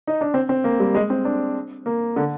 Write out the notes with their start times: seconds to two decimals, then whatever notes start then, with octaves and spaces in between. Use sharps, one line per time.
0.07 D#4
0.21 D4
0.34 C4
0.49 C4
0.64 A#3
0.80 G3
0.95 G#3
1.10 C4
1.25 D4
1.86 A#3
2.16 D3